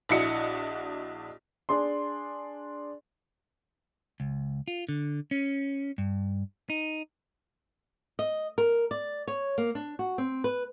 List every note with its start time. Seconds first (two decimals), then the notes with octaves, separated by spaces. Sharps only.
0.09 A#1 D4 E4 F#4 D#5 C#7
1.69 D4 G#4 C6
4.20 C#2
4.68 F4
4.89 D3
5.31 C#4
5.98 G2
6.70 D#4
8.19 D#5
8.58 A#4
8.91 D5
9.28 C#5
9.58 A#3
9.75 D4
9.99 F#4
10.18 C4
10.44 B4